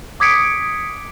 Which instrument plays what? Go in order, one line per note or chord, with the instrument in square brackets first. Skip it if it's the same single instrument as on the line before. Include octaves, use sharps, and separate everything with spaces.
[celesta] D6 D#6 G#6 B6 C#7 D7